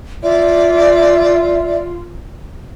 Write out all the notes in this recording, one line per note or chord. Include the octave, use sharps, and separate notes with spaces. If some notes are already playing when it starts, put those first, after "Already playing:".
F4 D5 E5